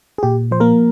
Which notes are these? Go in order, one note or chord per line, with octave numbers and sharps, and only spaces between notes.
G#4
A#2 G4
F3 C5
A#3 A#4